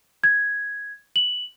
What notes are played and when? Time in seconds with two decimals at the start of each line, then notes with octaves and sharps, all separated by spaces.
0.24 G#6
1.16 F#7